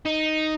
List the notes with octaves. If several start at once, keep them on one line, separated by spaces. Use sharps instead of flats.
D#4